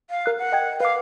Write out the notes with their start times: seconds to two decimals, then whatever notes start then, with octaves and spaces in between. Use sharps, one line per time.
0.10 F5
0.26 A#4 F#6
0.39 F#5
0.52 D#5 G5 G#6
0.80 B4 F5 D6